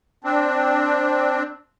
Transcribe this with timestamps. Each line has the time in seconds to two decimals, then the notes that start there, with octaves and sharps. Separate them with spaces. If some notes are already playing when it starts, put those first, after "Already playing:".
0.24 C4 D4